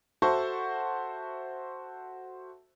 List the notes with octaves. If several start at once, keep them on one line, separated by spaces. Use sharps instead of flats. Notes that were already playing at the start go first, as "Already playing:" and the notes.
F#4 A4 C5 E5 A5 C#6